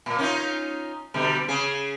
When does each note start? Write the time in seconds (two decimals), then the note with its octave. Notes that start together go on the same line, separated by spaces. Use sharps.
0.06 A#2 A#3
0.18 C#4 D#4 F4
1.14 B2 D3 G3
1.48 C#3 G#4